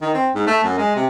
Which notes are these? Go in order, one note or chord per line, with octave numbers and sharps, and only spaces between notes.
D#3
C4
G#2
A3
F#2
G#3
C3